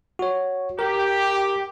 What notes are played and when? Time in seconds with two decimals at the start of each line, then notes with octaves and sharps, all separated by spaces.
0.19 F#4 C#5
0.79 G4 A#4